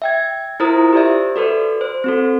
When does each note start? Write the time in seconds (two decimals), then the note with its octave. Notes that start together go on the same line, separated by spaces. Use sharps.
0.02 E5 G5 G#6
0.60 E4 F4 A#4 C5 A#5 D#6
0.93 G4 C5 D5 E5
1.36 F#4 A4 B4 D5
1.81 C5
2.04 C4 F#4 A4